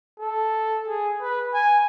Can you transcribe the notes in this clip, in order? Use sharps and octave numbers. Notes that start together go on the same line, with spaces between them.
A4
G#4
B4
G#5